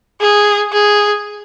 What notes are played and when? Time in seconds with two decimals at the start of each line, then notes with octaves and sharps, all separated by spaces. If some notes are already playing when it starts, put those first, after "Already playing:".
0.21 G#4
0.72 G#4